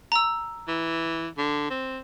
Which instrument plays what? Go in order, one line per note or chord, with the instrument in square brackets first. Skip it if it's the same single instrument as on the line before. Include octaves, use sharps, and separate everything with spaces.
[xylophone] A#5 E6
[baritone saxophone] E3
D3
C4